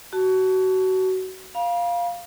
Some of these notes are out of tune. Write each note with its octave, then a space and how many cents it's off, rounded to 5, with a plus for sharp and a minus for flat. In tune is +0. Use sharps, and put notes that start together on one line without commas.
F#4 +25 A5 +0
F5 +0 B5 -45